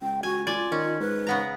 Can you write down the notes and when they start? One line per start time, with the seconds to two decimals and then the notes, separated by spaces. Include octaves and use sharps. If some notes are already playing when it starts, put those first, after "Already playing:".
0.02 C#2 G5
0.23 F#4 G#5
0.47 F4 D5 G#5
0.72 D#3 C#4
1.00 G#2 B4
1.27 C#3 B3 A#5